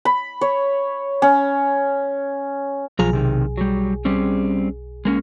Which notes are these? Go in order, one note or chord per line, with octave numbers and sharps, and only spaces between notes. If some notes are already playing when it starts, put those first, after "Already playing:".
B5
C#5
C#4
B1 F3 F4 G#4 A#5
C3 D#3
F#3 G3
G3 C4 C#4
G#3 A#3 C#4